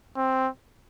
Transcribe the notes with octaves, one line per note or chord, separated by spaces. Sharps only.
C4